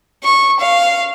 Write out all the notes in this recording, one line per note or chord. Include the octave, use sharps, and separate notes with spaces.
C#6
F5